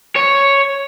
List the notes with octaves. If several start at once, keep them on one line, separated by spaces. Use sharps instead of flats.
C#5